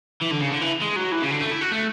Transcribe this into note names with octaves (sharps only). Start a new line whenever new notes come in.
E3
D3
C#3
D3
E3
G#3
F#3
E3
C#3
D3
A3
E4
F#4
A3